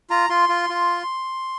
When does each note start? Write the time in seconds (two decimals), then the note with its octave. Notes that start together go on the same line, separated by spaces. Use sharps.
0.10 F4 A#5
0.30 F4 C6
0.49 F4
0.70 F4